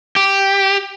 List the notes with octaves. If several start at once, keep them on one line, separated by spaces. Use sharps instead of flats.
G4